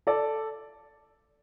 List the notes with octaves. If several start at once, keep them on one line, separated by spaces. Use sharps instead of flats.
A4 D5